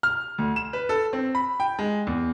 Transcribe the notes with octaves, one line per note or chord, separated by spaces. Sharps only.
F6
D2
E7
B4
A4
C4
B5
G5
G#3
E2